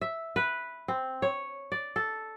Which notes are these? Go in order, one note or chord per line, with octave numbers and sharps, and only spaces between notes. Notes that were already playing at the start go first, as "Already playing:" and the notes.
E5
B4
C4
C#5
D5
A4